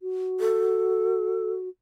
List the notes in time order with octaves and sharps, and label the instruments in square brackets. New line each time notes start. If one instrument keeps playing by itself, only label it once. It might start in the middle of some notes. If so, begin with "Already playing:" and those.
[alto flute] F#4
[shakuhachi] A4